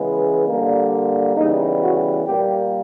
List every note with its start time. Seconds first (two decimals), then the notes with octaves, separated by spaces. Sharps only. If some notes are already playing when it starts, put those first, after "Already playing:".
Already playing: C#3 E3 G#3 B3
0.48 D3 G3 A#3
1.37 C#3 E3 G3 B3 D#4
1.82 F#4
2.27 A#2 G3 A#3 G4